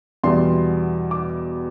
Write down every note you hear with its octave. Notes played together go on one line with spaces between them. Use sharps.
E2 B2 G3 C6
D6